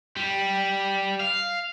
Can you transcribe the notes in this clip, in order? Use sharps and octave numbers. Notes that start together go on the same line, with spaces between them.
G3
F5